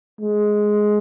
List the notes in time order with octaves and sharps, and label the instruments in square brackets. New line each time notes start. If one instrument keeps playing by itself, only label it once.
[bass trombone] G#3